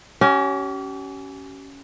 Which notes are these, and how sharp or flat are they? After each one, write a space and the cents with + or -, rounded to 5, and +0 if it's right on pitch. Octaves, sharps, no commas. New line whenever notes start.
C#4 +10 G4 -40